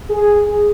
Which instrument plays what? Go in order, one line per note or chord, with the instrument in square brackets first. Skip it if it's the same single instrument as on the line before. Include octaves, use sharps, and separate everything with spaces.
[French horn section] G#4